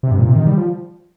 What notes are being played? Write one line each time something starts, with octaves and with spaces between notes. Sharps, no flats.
C3
G2
A#2
C3
D#3
G3
F3